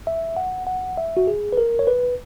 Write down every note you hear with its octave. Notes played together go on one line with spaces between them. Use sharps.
E5
F#5
F#5
E5
F#4
G#4
B4
A#4
C#5
B4